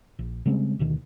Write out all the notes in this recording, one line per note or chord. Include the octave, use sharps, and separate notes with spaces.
A#1
C#3 G3 G#3 C4
D2 B2 D#3